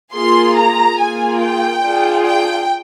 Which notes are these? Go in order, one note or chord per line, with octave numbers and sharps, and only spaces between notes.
A#3 F4 G#4 C6
A#5
A#3 F4 G#4 G#5
G5
D4 F4 G#4
G5